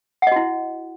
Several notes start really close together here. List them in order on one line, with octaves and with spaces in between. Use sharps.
F#5 D#5 F#4 E4